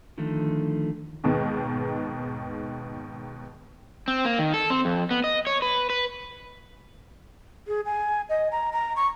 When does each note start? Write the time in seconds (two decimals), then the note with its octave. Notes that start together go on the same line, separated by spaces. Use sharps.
0.18 D3 D#3 F3 A3 A4
1.24 D#2 G#2 B2 D#3 G#3 B3
4.08 C4
4.25 A#3
4.39 D#3
4.54 A4
4.70 C4
4.85 F2
5.11 B3
5.24 D#5
5.47 C#5
5.62 B4
5.90 B4
7.68 G#4
7.85 G#5
8.29 D#5
8.52 A#5
8.73 A#5
8.96 C#6